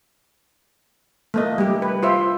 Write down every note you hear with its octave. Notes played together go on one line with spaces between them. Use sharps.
A3 A#3 D#5
G3 G4
B4
F4 C5 E5